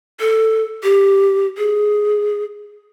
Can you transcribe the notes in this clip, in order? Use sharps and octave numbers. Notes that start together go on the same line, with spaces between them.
A4
G4
G#4